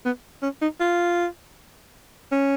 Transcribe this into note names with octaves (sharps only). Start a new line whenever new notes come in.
B3
C#4
D#4
F4
C#4